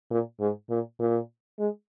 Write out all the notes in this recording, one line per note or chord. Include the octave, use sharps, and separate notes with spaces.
A#2
G#2
A#2
A#2
G#3